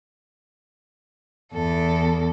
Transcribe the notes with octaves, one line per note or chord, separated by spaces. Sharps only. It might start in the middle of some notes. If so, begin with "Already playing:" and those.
E2 A4